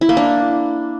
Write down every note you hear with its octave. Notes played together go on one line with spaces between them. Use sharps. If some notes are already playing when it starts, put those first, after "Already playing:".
E4
A#3
D4